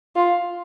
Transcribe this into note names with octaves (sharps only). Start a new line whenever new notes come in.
F4